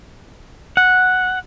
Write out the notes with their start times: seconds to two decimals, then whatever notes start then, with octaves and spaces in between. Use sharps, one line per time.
0.77 F#5